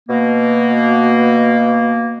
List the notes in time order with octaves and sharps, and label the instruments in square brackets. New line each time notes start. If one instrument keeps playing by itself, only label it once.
[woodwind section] B2 A#3